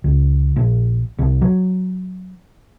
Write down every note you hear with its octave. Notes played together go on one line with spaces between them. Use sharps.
C#2
A#1
C2
F#3